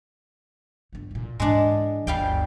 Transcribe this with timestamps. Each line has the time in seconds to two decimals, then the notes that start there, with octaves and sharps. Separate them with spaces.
0.93 G1 D#3
1.11 A#2 E3
1.40 G#2 E3 G#3 D4
2.07 G1 D2 G3 F5 G5